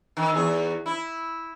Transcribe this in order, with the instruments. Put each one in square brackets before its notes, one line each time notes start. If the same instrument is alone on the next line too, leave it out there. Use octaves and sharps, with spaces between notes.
[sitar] D#3
E2 G#4
E4